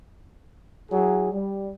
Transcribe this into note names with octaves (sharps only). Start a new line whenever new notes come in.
F#3 E4 G#4
G3